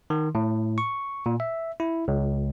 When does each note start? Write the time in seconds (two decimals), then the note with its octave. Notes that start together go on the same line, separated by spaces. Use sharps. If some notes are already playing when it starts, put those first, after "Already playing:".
0.10 D#3
0.35 A2
0.78 C#6
1.26 A#2
1.40 E5
1.80 E4
2.08 C#2